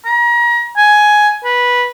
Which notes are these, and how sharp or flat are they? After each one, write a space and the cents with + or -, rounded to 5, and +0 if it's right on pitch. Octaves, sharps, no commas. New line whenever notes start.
A#5 +35
G#5 +10
B4 -10